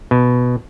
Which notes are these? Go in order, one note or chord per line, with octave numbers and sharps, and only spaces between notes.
B2